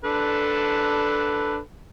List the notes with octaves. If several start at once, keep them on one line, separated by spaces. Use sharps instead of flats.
D4 A4 B4